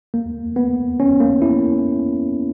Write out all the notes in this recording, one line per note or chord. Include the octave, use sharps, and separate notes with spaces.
A#3
B3
C#4
A#3
E4